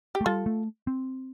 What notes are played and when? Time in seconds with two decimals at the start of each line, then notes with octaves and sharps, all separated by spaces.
0.15 G4
0.21 A3
0.26 G3 F4 A4
0.46 A3
0.87 C4